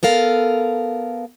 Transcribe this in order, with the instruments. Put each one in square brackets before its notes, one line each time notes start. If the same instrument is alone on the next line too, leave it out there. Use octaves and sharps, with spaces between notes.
[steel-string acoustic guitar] B3 A4 A#4 F5